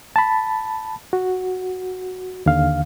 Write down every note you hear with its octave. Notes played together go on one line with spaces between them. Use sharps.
A5 B5
F#4
D#2 D3 F5